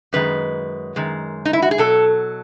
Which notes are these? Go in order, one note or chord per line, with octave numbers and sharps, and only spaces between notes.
F#2 D#3 G#3 B4
F#2 D#3 G#3
D#4
E4
F#4
G#4
B2 F#3 A4